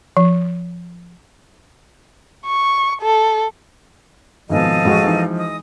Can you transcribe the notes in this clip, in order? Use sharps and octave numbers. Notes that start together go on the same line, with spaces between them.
F3
C#6
A4
G#1 G#2 B2 F3 A4 D#5 F5
A1 G#3 F#4 G#4
E3 D#4
D#5 D#6